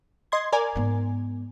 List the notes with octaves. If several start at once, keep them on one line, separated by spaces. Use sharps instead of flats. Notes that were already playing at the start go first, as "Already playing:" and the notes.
D#5 C6 G#6
A#4 D5 G#5
G#2 B3